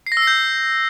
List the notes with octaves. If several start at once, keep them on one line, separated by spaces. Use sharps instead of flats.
C7
A#6
E6
C7
G6